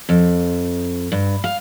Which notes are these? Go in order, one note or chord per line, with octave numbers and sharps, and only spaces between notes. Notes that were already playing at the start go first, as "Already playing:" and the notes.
F2
G2
F5